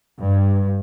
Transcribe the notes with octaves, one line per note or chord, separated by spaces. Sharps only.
G2